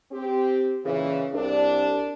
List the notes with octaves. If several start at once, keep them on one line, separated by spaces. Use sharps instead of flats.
C4 G4
A#2 C#3 E3
C2 D4